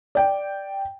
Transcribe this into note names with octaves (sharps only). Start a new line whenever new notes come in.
D5 G5